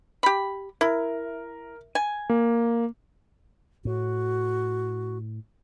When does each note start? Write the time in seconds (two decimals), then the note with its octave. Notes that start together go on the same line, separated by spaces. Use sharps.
0.23 G4 B5
0.81 E4 A#4
1.95 G#5
2.30 A#3
3.85 A2 F#4